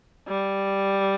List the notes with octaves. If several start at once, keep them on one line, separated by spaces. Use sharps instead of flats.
G3